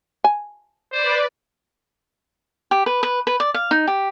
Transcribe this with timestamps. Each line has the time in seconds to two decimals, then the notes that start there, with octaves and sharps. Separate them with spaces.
0.24 G#5
0.92 B4 C5 D5
2.71 G4
2.86 B4
3.03 B4
3.27 B4
3.40 D5
3.54 F5
3.71 D#4
3.87 G4